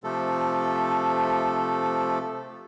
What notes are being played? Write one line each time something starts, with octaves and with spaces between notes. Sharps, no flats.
C3 F3 A3 A4